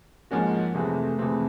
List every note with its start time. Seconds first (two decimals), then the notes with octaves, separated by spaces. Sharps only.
0.31 G#2 F3 G#3 A#3 C#4 F#4
0.75 F2 C3 E3 G#3 A3 C4
1.19 F2 C3 E3 G#3 C4